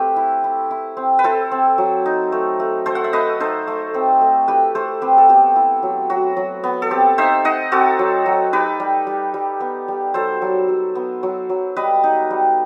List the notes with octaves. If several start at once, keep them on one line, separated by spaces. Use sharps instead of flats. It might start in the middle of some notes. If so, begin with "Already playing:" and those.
Already playing: A3 C4 G4 A4 B4
E4
E4
E4
C4
B4
E4 A4 C5
C4
F#3
D#4
A3
A3
A3 A4 C5
F#5
E5
A3 B4 D#5
D#4 A4 C5
A3
C4
A3
E4 G4 B4
A3 A4 C5
C4 G4 B4
A4
B3 G4
E4
F#3
F#3 F#4
F#3
B3
A4
C4 G4
D#4 C5 E5
D#4 D#5 F#5
C4 F#4 A4
F#3
F#3
D#4 G4 B4
G3
G3
G3
B3
G3
F#3 A4 C5
F#3
F#3
B3
F#3
F#3
G3 B4 D#5
D#4
G3